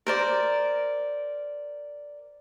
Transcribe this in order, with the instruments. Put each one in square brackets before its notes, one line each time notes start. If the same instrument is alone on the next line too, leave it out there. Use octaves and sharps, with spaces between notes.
[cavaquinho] A#4 C5 D5